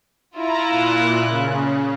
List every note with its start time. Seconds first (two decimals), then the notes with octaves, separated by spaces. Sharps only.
0.36 E4 F4 A#5
0.68 A#2 F#6
1.25 C#3